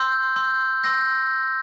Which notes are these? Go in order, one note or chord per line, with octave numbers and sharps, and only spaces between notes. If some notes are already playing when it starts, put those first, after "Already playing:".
Already playing: C6 E6 G6
C6 E6 G6
C6 E6 G6 A#6